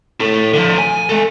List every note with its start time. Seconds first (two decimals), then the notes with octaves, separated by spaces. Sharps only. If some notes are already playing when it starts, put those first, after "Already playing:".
0.20 E4 A4
0.54 D3 F3
0.78 G#5
1.09 G#3 A4